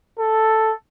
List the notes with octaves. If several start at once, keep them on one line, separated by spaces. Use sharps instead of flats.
A4